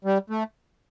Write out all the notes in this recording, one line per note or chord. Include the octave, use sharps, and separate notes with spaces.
G3
A3